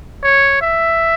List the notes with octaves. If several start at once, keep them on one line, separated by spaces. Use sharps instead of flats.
C#5
E5